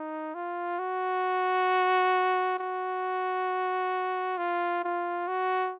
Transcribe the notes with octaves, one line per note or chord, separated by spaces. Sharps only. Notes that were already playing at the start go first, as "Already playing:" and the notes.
Already playing: D#4
F4
F#4
F#4
F4
F4
F#4